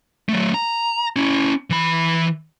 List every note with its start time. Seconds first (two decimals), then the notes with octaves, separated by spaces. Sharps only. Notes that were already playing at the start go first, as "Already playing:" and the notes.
0.29 F#3 A3
0.54 A#5
1.16 C#4 E4
1.70 E3 B5